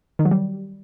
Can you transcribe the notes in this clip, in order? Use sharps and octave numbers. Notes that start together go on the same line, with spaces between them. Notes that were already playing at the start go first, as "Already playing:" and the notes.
D#3
F#3
G3